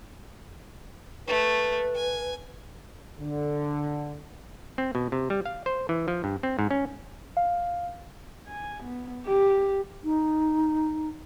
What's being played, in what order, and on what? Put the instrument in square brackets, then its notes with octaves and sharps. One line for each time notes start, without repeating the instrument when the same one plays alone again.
[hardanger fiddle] A3 [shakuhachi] B4
[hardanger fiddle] G#5
[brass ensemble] D3
[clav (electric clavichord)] C4
B2
C3
G3
F5
C5
E3
F3
G2
C4
G#2
C#4
[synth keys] F5
[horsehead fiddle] G#5
B3
G4
[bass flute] D#4